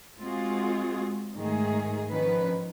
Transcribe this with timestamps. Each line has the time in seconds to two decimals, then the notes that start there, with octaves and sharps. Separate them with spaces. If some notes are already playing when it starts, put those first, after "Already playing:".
0.20 G#3 C4 F4 F#4 G#4
1.36 G#2 D#3 A3 G#4
2.10 D#3 F3 C#4 B4